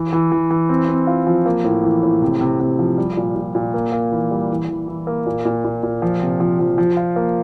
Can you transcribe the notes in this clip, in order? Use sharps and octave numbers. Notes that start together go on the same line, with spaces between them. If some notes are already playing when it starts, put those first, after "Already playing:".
Already playing: E3
E3
E3
E3
C4
C4
F4
F3
A#3
A2
E3
A2
C3
C3
C3
F3
G3
A#2
A#2
A#2
A#3
A#3
E3
G3
E3
E3
E3
A#3
A#2
A#2
A#2
A#2
F3
C3
F3
F3
F3
F4
A#3